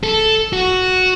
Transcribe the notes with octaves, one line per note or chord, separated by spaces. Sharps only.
A4
F#4